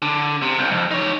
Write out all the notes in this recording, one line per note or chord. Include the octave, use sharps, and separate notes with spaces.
D3
C3
C2
F2
D#4 C#5